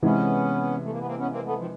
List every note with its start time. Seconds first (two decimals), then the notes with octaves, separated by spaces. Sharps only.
0.02 C3 E3 G#3 B3 C#4
0.83 A3
0.91 A#3
0.99 B3
1.06 A#3 C4
1.18 B3 C#4
1.31 A#3 C4
1.45 A3 B3
1.58 D#3 F3